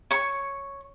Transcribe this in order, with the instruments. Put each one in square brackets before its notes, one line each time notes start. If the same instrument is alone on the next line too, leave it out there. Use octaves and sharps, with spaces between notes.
[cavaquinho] C#5 C#6